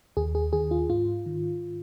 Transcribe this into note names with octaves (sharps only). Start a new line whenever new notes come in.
D#2 G#4
G#4
D#3 G#4
F4
G#2 F4
D#3